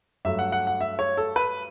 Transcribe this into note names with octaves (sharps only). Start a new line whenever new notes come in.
G2 F#3 A3 E5
F#5
F#5
F#5
E5
C#5
A4
B4